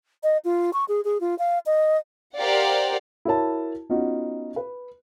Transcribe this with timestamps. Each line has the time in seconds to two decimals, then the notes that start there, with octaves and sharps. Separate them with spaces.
0.23 D#5
0.45 F4
0.73 C#6
0.88 G#4
1.05 G#4
1.20 F4
1.39 F5
1.66 D#5
2.36 G4 A#4 C5 D5 F5 F#5
3.25 E4 F#4 A#4 C#5 A5
3.89 B3 C#4 D#4 F4 F#4
4.56 B4